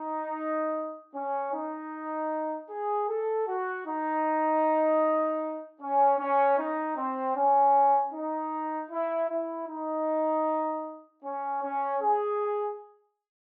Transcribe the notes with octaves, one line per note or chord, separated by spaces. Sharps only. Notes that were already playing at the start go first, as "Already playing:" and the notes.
Already playing: D#4
C#4
D#4
G#4
A4
F#4
D#4
C#4
C#4
D#4
C4
C#4
D#4
E4
E4
D#4
C#4
C#4
G#4